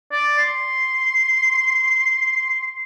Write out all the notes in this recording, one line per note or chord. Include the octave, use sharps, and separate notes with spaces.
D5
C6